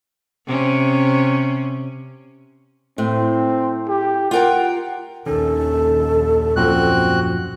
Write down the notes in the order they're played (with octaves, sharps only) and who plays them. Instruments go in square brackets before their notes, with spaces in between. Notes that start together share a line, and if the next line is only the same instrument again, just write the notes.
[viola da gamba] C3 C#4
[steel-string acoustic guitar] A2 [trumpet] C4
[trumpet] G4
[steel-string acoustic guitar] F4 A#4 G5 [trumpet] F#5
[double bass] A#1 D#2 [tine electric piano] D#3 C#4 [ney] A4
[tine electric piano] F#2 A#2 F3 [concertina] C4 F#4 F#6